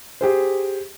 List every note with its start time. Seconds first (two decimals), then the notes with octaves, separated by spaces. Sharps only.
0.21 G4 G#4 C5